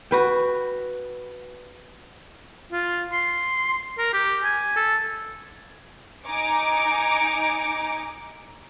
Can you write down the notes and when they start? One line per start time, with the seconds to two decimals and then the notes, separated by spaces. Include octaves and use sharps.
0.11 F#4 B4 G5
2.72 F4
3.12 C6
3.98 A#4
4.13 G4
4.44 G#5
4.76 A4
6.25 D#4 G#5 A#5 D6 C#7 D7